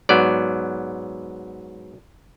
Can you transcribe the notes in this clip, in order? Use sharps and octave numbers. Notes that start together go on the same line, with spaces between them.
G#2 F#3 B3 D5